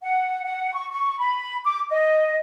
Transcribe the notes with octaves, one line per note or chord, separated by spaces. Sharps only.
F#5
F#5
C#6
C#6
B5
D6
D#5